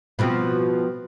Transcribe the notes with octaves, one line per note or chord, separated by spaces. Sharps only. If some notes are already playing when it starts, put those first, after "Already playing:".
B2 F3 C4